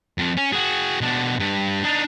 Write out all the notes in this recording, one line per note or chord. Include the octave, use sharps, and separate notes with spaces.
F2
C#4
F#4 G#4
B2 D4
G2
D4 D#4